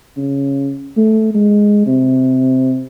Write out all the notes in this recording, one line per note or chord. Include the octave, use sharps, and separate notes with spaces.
C#3
A3
G#3
C3